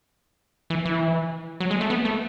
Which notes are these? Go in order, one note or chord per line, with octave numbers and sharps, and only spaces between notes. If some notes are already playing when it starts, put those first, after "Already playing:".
E3
E3
F#3
G#3
A3
B3
A3